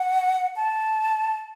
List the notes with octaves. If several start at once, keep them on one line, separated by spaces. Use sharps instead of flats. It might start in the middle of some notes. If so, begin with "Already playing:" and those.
Already playing: F#5
A5